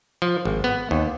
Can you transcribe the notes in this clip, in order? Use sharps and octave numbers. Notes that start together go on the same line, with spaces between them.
F3
G#1
B3
D#2